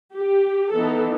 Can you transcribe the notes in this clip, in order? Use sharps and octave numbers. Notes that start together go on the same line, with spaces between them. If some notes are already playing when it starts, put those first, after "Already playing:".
G4
E3 B3 D#4 A4